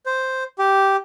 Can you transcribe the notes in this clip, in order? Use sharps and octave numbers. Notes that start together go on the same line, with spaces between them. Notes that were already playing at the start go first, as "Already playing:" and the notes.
C5
G4